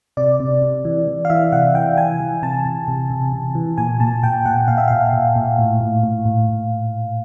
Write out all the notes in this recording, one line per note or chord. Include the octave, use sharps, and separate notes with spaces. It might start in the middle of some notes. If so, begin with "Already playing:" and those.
C3 D5
C3
C3
E3
E3
F5
E3 E5
C3 F#5
E3 G5
E3 G#5
E3
C3 A5
C3
C3
C3
C3
E3
A#2 G#5
A#2 A5
A#2 G5
A#2 F#5
A#2 F5
E5
A#2 F5
A#2
A#2
A2
A2
A2
A2